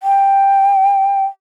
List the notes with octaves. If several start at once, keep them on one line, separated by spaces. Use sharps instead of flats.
G5